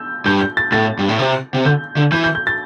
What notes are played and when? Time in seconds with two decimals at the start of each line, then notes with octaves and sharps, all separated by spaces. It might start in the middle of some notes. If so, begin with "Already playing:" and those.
Already playing: E6 G6
0.26 G2 G6
0.41 G6
0.57 A6
0.72 A2 A6
0.99 G2
1.09 A2
1.19 C3
1.54 C3
1.65 D3 G6
1.97 D3
2.12 E3 G6
2.24 G6
2.35 G6
2.47 A6